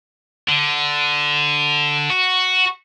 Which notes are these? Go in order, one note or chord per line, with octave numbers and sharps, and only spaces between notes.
D3
F#4